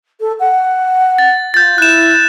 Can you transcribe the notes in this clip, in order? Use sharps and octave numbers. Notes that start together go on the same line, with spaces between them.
A4
F#5
A6
F4 G6 A6
E4 F#6 E7